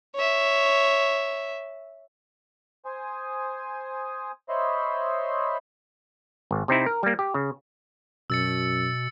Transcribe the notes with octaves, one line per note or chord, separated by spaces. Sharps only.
C#5 E5
C5 G#5 D#6
C5 C#5 D#5 E5 B5 C6
G#1
C3 C4 D#4 E4
A#4
G3 A#3
G4
C#3
F#2 B2 E6 A6 C#7